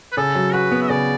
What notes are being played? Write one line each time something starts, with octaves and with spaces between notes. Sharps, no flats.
B4
C#3 A4
F#3
F#4 B4
B3
E5
C#3 D5